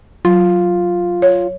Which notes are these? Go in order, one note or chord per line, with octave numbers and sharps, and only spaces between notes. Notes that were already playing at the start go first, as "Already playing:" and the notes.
F#3 F4
C#5